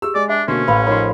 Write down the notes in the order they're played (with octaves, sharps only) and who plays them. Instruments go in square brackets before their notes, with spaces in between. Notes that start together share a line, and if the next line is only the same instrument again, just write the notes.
[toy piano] G4 G#4 [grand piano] E6
[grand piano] G#3 [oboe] D5
[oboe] D4 [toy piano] E5
[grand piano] B2 D3 A#3 [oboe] C#4 [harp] C5 B6
[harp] A1 [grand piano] B4 [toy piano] F5 B5 E6
[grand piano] F3 D#4 A#4 [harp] C5 B5 [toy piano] C#5